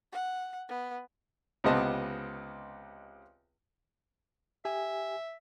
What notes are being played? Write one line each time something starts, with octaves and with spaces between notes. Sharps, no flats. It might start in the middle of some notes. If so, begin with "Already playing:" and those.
F#5
B3
C#2 C3 B3 D#5 A5
G4 E5 G#5